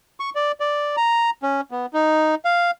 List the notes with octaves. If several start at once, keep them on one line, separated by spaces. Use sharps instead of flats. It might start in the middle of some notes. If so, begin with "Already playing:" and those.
C#6
D5
D5
A#5
C#4
B3
D#4
F5